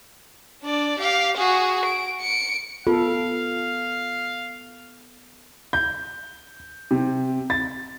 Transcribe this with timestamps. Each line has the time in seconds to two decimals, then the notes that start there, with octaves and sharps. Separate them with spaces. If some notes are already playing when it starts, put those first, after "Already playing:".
0.63 D4 D5
0.99 G4 F5
1.37 F#4 G#4
1.85 D7
2.21 C#7 D7
2.87 B3 F4 A4 F5
5.73 G6
6.91 C3
7.50 A6